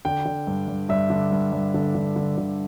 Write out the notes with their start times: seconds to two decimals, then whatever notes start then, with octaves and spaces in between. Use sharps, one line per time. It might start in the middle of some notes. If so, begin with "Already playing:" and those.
0.05 D3 G5
0.25 D3
0.47 G2
0.68 G2
0.89 G2 E5
1.10 D3
1.32 G2
1.53 G2
1.74 D3
1.95 D3
2.16 D3
2.38 D3